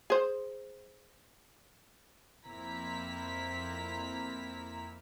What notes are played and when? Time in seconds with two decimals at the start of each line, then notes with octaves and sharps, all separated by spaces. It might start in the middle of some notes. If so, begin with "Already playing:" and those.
0.10 G#4 C5
2.47 F2 A#3 C4 E4 A#5 B6